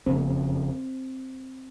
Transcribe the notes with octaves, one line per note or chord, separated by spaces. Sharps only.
F#1 F2 C#3 C4
A#3
C4